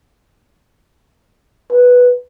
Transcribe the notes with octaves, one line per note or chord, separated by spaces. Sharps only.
B4